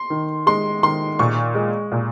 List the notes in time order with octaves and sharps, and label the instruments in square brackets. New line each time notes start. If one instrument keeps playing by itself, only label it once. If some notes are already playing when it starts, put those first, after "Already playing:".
Already playing: [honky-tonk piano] C6
[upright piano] D#3
[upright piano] G#3 [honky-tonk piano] C6
[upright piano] D#3 [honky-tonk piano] C6
[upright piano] A#2 [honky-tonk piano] C#6
[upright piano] G#3
A#2